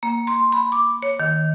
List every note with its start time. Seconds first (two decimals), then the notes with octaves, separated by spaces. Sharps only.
0.03 A#3
0.27 C6
0.52 B5
0.72 D6
1.03 C#5
1.20 D#3